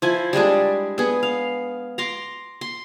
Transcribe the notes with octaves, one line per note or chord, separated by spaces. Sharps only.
F3 E4 G#5
G3 G#3 D4 G#4
B3 G#4
F5
A#5 C6 D6
C6